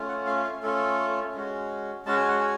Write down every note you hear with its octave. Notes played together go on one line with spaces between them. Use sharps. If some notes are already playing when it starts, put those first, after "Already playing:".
Already playing: A3 C#4 F4
F#5
F5
F5
A3 C#4 F4 A4
G#3 C#4 F#4
G#3 C#4 F#4 A5
G#5
F#5
G#5